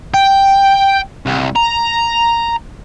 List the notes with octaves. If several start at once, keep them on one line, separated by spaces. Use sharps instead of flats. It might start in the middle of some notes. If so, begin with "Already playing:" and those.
G5
C2
A#5